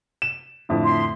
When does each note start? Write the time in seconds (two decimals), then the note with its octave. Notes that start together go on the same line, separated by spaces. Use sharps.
0.22 E7
0.69 F2 A2 D3
0.84 E5 C6